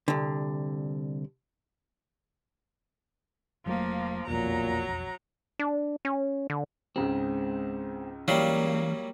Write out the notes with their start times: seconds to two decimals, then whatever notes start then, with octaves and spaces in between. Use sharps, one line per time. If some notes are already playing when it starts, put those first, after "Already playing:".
0.08 C2 D3
3.66 F1 F3 F#3 A3 A#3
4.27 E1 B1 F2 A#2 F#3 A#5
5.59 D4
6.05 C#4
6.50 D3
6.96 C#2 G#2 C#3 C4
8.28 E3 F#3 G3 A#3 E4 F5